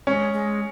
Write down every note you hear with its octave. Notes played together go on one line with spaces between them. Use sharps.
G#3 C#4
G#3